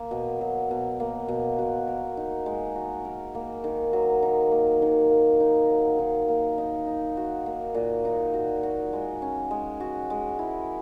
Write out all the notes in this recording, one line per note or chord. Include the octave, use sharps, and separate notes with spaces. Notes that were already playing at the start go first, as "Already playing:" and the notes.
Already playing: A#3
B2
F#3
B2
A#3
B2
F#4
A#4
D#4
G#3
F#4
A#4
A#3
D#3
F#3
D#3
A#3
D#3
A#3
D#4
F#3
D#3
A#3
D#4
D#4
F#4
A#3
A#2
D#4
F#4
F#4
G#3
C#4
G#3
F#4
G#3
E4